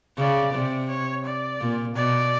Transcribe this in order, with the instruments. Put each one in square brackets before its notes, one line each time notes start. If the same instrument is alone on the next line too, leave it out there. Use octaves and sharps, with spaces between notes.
[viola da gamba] C#3 [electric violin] D5
[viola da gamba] C3
[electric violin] C#5
D5
[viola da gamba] A#2
[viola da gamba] B2 [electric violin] D5